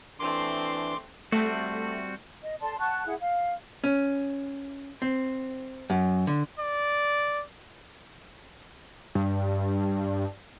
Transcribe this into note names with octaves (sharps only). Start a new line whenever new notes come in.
E3 A3 C4 D4 C6 D6
G3 A3 C4 F#4
D#5
A4 D5 A5 C6
F#5 A5 C#6 F#6
E4 G#4 F#5
F5
C#4
C4
F#2
D3
D5
G2